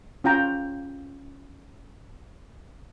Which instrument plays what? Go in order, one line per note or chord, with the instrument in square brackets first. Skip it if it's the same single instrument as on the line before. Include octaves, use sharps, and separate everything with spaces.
[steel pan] C#4 F4 G5 A#5